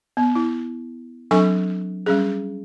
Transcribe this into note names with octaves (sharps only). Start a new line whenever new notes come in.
B3
E4
F#3 C4 D4 A4 G#5 C#6
G3 C#4 G#4